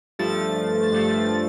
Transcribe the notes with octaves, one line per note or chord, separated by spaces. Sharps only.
G2 F3 A3 A6
G2 F3 A3